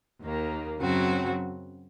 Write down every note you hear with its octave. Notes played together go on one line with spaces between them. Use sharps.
D#2 D#3 A#3
F#2 C#3 F#3 C4 F#4